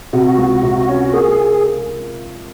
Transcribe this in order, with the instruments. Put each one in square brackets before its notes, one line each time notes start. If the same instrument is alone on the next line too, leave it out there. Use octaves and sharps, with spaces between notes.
[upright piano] C3 [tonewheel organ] F#4
[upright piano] C#2
C3
C#4
[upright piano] A#3 [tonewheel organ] G#4